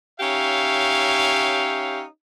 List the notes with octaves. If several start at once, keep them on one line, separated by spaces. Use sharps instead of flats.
C#4 D#4 G4 C#5 E5 F5